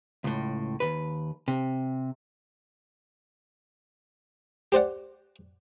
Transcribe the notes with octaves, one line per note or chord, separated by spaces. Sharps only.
C#2 A2
D#2 G#2 B4
C3
G4 C5 D5 F#5